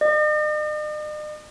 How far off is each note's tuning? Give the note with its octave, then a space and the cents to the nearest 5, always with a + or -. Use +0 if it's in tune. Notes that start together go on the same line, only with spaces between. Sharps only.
D#5 -45